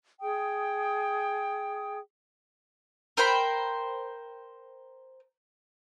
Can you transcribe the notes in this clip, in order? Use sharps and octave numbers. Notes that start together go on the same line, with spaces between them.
G#4 G5 D#6
A#4 C5 G5 B5